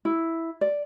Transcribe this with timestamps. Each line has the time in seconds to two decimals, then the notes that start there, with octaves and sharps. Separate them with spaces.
0.05 E4
0.61 D5